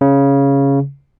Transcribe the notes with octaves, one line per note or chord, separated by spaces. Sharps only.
C#3